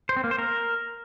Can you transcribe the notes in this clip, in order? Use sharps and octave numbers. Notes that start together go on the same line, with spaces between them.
C5
C4
A#3
C5
A#4